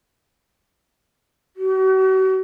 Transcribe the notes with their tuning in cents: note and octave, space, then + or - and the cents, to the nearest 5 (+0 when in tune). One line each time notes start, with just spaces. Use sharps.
F#4 +40